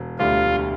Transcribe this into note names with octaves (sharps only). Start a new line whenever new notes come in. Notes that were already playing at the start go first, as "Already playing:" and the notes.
Already playing: E1
D2 D3 G3 D4 F4